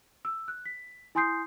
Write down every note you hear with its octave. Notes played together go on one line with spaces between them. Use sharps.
E6
F#6
B6
E4 G#5 C6 D#6 G6 C7